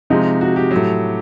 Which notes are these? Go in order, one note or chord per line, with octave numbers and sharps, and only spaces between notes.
C3 F3 G#3 D#4
F#4
G4
A2 F#3